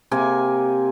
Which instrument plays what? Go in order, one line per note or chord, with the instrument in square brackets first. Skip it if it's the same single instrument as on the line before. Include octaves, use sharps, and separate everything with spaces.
[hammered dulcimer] C3 A#3 G#5